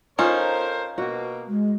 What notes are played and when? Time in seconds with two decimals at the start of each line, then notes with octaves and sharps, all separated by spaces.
0.19 C#4 D#4 F4 A4 A#4 C5
0.98 B2 A#3 F#4
1.48 G#3